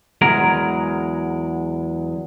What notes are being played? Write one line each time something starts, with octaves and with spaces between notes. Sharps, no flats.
E2 F#3 G#3 A#4